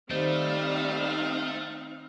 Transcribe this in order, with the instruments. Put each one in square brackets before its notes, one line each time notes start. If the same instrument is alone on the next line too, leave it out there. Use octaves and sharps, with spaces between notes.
[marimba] D#3 C5 [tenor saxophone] G3 [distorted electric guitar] A3 [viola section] C4 D#4 F5